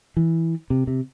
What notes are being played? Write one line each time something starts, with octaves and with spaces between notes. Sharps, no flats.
E3
C3
C3